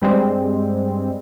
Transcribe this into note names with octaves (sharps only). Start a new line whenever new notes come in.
G2 G3 G#3 C4